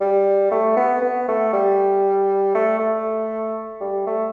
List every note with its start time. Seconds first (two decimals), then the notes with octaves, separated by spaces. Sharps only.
0.01 G3
0.51 A3
0.77 B3
1.02 B3
1.28 A3
1.53 G3
2.55 A3
2.80 A3
3.81 G3
4.07 A3